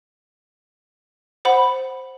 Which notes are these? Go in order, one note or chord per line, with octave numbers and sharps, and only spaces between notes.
C5 F#5 B5